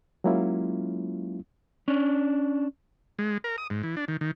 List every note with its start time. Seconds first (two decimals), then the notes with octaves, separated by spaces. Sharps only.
0.24 F#3 G#3 A#3 C#4 E4 F4
1.88 C#4 D4
3.19 G#3
3.44 A#4
3.58 D#6
3.70 G#2
3.83 E3
3.96 D4
4.08 D#3
4.21 D#3